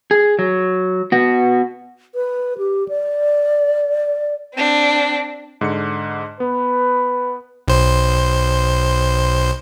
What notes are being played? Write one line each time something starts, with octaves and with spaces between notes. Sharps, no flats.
G#4
F#3
B3 F#4
B4
G4
D5
C4 D4
G#2 D3 C#7
B3 B4
B1 C5